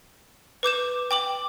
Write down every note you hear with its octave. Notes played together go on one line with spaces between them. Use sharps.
B4 D6 G6 E7
G5 D6 F#7